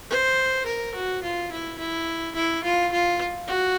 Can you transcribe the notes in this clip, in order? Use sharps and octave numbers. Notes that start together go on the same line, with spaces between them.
C5
A#4
F#4
F4
E4
E4
E4
F4
F4
F#4